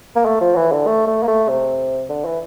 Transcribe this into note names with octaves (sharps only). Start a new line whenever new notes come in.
A#3
A3
F3
E3
D3
A3
A3
A#3
A3
C3
D3
E3